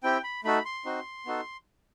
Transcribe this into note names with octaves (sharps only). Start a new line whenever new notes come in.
C4 E4 G4 G5
B5
A3 D#4 F#4 A4 B5
C6
C4 D#4 F#4
B3 D#4 F#4 A4